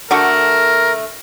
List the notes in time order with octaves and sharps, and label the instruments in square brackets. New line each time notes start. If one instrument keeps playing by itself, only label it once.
[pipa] D3 A3 F#4 [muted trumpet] A#4